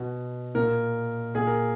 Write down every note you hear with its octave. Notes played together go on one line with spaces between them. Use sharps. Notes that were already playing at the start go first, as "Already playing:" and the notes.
Already playing: B2
A#2 A#4
A#2 G#4
A#4